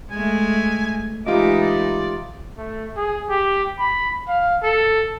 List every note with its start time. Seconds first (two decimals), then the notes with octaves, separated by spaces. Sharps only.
0.11 G#3 A3 G#5
1.26 E3 G#3 D#4 F4 G4 D#5 D6
1.61 D5
2.58 A3
2.97 G#4
3.30 G4
3.79 B5
4.28 F5
4.63 A4